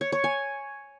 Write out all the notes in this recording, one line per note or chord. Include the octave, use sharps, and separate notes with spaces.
C#5
C#5
G#5